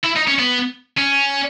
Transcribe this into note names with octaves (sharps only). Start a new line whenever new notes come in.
E4
D#4
C#4
B3
C#4